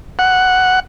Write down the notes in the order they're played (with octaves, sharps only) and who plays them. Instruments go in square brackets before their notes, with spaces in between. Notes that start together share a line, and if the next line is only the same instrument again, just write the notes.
[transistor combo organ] F#5